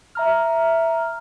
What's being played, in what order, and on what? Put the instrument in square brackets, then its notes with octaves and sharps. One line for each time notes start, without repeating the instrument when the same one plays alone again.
[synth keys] E5 A#5 F6